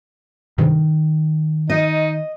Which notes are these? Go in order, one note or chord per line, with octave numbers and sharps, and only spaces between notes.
G2 C3 D#3
D#4 D#5